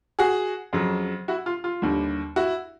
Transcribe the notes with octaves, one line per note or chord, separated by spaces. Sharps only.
F#4 G#4
F2 C#3 F#3
E4 F#4
F4
F4
D#2 D3 G3
E4 F#4